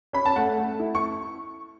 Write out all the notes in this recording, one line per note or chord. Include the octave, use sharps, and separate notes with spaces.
C#4 B5
A5
A3 F#5
A3
E4
C#6